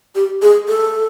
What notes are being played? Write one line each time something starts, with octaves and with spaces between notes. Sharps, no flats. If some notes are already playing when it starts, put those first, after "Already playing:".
G4
G#4
A4